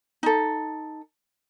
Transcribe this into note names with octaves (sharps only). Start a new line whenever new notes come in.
D#4 A4